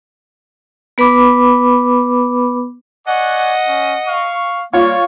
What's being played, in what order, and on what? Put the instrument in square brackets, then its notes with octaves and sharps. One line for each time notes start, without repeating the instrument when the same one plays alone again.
[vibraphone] B3 B4 B5 D6
[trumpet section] D5 G#5 C#6 [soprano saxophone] D#5 [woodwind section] F#5
[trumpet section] C#4
F5 C#6
[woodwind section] G3 A#3 [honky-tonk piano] F4 [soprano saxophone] C#5 [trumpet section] C#6